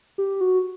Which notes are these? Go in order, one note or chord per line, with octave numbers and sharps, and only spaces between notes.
G4
F#4